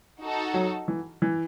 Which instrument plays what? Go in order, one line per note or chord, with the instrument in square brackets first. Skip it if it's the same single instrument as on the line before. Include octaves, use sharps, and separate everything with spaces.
[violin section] D#4 F#4 A4
[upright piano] F#3
E3
E3